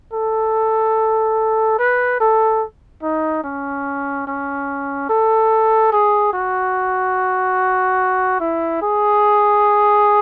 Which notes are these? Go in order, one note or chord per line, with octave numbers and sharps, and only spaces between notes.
A4
B4
A4
D#4
C#4
C#4
A4
G#4
F#4
E4
G#4